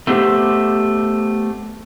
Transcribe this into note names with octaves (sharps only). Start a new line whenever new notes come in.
A3 B3 G4 C5